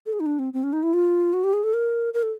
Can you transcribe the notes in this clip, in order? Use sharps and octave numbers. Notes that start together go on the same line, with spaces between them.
A4
G#4
D#4
D4
C4
C4
C#4
D#4
E4
F4
F#4
G4
G#4
A4
A#4
A#4
A4